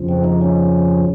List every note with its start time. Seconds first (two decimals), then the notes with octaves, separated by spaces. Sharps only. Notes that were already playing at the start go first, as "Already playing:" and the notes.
Already playing: F2 C#3 F3
0.09 C4
0.24 D#4
0.41 C#4